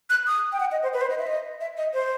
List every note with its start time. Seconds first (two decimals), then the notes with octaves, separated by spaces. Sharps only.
0.10 F#6
0.27 D#6
0.53 G5
0.60 F#5
0.72 D#5
0.83 C5
0.93 B4
1.01 C5
1.10 D#5
1.19 E5
1.27 D#5
1.60 E5
1.77 D#5
1.94 C5